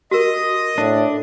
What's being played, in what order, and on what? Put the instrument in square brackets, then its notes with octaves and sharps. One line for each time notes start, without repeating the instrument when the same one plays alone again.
[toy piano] F#4 A#4 [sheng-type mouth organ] D#5 D#6
[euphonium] A2 [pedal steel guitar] D4